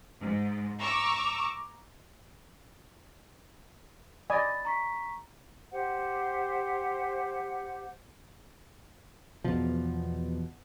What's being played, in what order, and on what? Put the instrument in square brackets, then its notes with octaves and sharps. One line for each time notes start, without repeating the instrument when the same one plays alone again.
[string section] G#2
A#5 C#6 D6 E6
[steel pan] D5 D#5 G#5 [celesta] B5 A6
[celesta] A#5 C#6 B6
[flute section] G4 C5 F#5
[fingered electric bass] E2 F3 [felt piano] B2